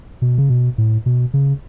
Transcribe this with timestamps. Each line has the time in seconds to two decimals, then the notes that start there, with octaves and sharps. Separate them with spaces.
0.22 B2
0.38 C#3
0.50 B2
0.78 A2
1.06 B2
1.34 C#3